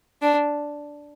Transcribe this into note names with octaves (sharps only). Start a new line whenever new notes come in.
D4